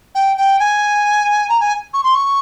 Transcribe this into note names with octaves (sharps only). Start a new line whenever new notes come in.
G5
G5
G#5
A#5
G#5
C#6
C6
C#6